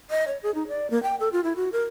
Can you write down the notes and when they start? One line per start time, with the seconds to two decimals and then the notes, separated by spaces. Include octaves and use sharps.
0.11 D#5
0.27 C#5
0.43 G#4
0.55 D#4
0.68 D5
0.90 A#3
1.03 G5
1.20 A4
1.33 F4
1.44 E4
1.56 F#4
1.72 A#4